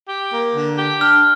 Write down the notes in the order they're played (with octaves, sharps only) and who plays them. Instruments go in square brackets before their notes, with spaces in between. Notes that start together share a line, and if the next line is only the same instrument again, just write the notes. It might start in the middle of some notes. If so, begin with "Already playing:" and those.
[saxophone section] G4
A#3
D3
G4
[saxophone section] D4 [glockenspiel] F6